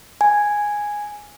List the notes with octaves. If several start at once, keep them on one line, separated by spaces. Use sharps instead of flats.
G#5